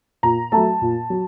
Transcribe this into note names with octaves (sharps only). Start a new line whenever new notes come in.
A#2 A#5
F#3 A3 A5
A#2
F#3